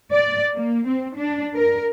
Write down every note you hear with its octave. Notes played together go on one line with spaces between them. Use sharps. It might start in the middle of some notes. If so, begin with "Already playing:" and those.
D5
A#3
C4
D4
A#4